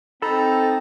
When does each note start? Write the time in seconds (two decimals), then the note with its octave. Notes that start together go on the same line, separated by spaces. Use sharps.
0.22 C4 D#4 A4 A#5 B5